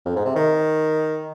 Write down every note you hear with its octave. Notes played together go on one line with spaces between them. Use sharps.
F2
G#2
C3
D#3